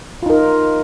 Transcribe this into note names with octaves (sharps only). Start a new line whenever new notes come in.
D#4 F4 A#4